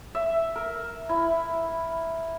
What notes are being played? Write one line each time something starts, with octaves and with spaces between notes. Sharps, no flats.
E5
A#4
E4